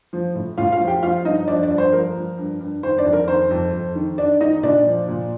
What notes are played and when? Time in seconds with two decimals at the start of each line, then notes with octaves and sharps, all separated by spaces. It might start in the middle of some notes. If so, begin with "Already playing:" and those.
0.13 F3
0.35 A2
0.57 A2 F4 F5
0.72 F4 F5
0.80 F3
0.87 G4 G5
1.03 F3 F4 F5
1.25 G2 D#4 D#5
1.47 F3 D4 D5
1.63 D4 D5
1.70 G2
1.78 C5
1.93 F3 A#4
2.15 F3
2.38 G2
2.60 G2
2.83 D#3 C5
2.98 D4 D5
3.06 F2
3.13 A#4
3.28 D#3 C5
3.51 F2
3.73 F2
3.95 D#3
4.18 D#3 D4 D5
4.41 D#3 D#4 D#5
4.63 A#2 D4 D5
4.86 F3
5.08 A#2